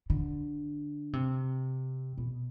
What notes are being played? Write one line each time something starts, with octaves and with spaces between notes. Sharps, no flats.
D3
C3
B2